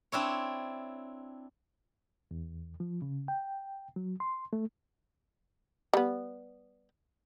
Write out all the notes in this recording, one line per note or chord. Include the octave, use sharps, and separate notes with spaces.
C4 D4 E4 C#5
E2
F3
C#3
G5
F#3
C6
A3
G3 B3